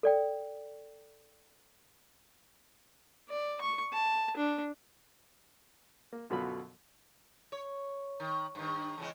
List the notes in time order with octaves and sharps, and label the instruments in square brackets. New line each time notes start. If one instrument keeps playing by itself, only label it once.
[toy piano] A4 D5 G5
[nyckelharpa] D5
C#6
A5
D4
[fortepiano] A#3
F#2 B2 D3 F#3 F4 B5
[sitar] C#5
D#3
G2 D#3
E2 C#3 G#3